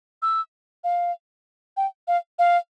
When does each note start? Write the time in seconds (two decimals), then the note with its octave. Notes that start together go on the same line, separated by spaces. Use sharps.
0.22 E6
0.84 F5
1.77 G5
2.08 F5
2.39 F5